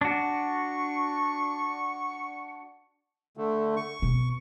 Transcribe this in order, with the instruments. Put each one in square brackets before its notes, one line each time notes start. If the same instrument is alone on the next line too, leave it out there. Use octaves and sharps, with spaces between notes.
[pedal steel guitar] D4 F#4 [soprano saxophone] C#6
[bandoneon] D3 A3
C#6
[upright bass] B2